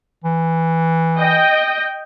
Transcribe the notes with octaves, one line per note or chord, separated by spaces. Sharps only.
E3
D#5 G5